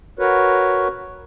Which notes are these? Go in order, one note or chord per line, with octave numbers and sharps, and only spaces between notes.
F#4 A#4 B4 C#5